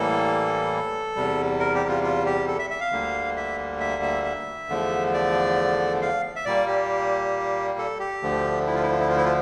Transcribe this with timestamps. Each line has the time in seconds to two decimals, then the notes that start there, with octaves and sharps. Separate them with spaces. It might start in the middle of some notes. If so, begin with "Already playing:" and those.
Already playing: A2 E3 G3 A#3 A4
1.16 E2 C3 G3
1.60 A#4
1.75 G4
1.89 F4
2.03 F4
2.26 G4
2.48 A4
2.59 E5
2.70 E5
2.80 F5
2.92 D2 D3 G3 A#3
3.37 E5
3.80 E5
4.02 E5
4.24 E5
4.69 E2 D3 F3 A3
5.14 D5
6.02 F5
6.36 E5
6.45 A#2 G3 A#3 D5
6.67 G4
7.78 A4
8.00 G4
8.22 D2 D3 F3 A3
8.66 E4
8.75 F4
8.83 E4
8.91 F4
9.00 E4
9.08 F4
9.17 E4
9.25 F4